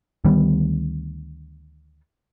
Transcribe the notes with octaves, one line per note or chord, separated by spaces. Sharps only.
D2 D#3 G3 B3